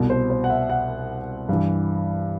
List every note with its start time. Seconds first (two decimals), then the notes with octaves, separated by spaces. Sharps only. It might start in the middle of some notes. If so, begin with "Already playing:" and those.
Already playing: C2 B2
0.10 C5
0.30 C5
0.44 F#5
0.50 E5
0.70 F#5
1.49 G2 E3